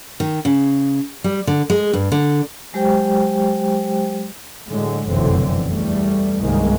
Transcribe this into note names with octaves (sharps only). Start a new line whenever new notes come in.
D#3
C#3
G3
D3
G#3
G2
D3
F#3 G#3 G4 C5 G5
A2 D3 F#3 G#3
F1 B1 F#2 D3 E3 C4
E2 G3 A3
C2 G2 D#3 G#3 A#3